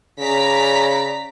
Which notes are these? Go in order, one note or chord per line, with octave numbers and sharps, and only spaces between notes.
C#3 D5 A#5 B6